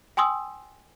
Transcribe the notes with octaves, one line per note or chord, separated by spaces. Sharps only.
G5 G#5 C6 D#6 E6